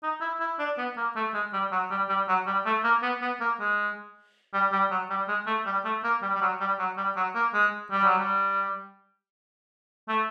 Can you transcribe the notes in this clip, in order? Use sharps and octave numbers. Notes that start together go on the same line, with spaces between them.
D#4
E4
E4
D4
B3
A#3
A3
G#3
G3
F#3
G3
G3
F#3
G3
A3
A#3
B3
B3
A#3
G#3
G3
G3
F#3
G3
G#3
A3
G3
A3
A#3
G3
G3
F#3
G3
F#3
G3
F#3
A#3
G#3
G3
F#3
G3
A3